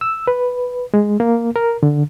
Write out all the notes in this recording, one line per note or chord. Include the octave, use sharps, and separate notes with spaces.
E6
B4
G#3
A#3
A#4
D3